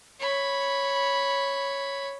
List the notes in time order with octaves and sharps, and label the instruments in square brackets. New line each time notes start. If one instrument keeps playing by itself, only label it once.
[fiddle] C#5 B5